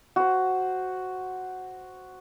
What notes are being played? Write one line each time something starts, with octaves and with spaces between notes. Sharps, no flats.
F#4 C5